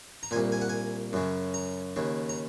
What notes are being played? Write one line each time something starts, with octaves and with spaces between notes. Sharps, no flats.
A#5
A#2 G#5
C2
G#5
F#5
G#5
F#2 C#3
A#5
D#2 C#3
A#5